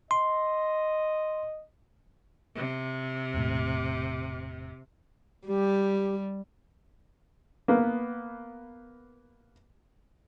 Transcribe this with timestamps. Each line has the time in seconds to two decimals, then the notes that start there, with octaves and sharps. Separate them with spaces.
0.11 D#5 C6
2.55 C3
3.34 E1 A2
5.48 G3 G4
7.68 A#3 B3